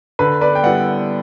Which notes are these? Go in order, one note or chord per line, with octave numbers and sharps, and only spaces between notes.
D3 B4
B4 D5
G5
G3 B3 E4 D5 F#5